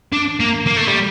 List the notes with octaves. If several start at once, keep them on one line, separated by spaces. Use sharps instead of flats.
D4
A#3
A#3
A3
G3